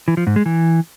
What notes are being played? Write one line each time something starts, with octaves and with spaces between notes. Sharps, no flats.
E3
F3
G#2
G#3
E3